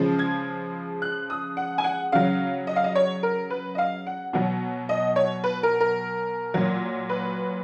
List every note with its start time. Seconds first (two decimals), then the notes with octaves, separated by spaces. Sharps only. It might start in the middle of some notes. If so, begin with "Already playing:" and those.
Already playing: C#3 F3 G#3
0.19 G#6
1.02 F#6
1.30 D#6
1.57 F#5
1.78 G#5
1.84 F#5
2.12 C#3 F#3 F5
2.67 D#5
2.76 F5
2.84 D#5
2.95 C#5
3.23 A#4
3.50 B4
3.75 D#5
3.78 F5
4.07 F#5
4.33 B2 F#3 F#5
4.89 D#5
5.16 C#5
5.44 B4
5.63 A#4
5.80 A#4
6.54 A#2 F#3
7.09 B4